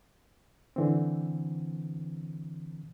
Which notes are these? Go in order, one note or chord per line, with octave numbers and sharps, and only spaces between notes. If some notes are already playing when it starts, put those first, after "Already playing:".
D3 E3 C4